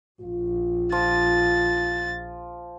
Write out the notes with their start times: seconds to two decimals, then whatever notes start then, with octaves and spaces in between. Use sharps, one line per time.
0.22 A#1 F4
0.92 F3 A6